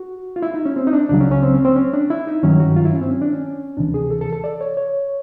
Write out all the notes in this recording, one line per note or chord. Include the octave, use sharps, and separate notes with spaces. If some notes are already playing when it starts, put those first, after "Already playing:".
Already playing: F#4
F4
E4
D#4
C#4
C4
D#4
D4
C#2 C#3 F#3 D4
C#4
C#4
C4
C#4
C4
C#4
D4
E4
D#4
G2 D#3 F#3 C#4
F#4
F4
E4
C#4
C4
C#4
D4
C#4
D2 C3 E3 D4
G#4
A4
A4
A4
D5
C#5
C#5